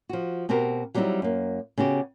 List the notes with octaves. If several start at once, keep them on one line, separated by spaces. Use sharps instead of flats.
F3 F#4
B2 C4 F#4 G4 A#4
F#3 G3 B3 C4 D#4 E4
F#2 A#3
C#3 B3 F#4 G4